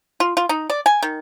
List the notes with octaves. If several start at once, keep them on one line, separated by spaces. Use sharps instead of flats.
F4
F4
D#4
D5
G#5
D#3